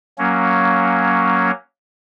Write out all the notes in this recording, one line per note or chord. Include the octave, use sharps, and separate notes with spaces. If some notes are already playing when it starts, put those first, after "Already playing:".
F#3 A#3 C#4